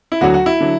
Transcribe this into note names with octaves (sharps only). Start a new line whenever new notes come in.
E4
D2 D3 F#3 F#4
F#4
E4
D3 F#3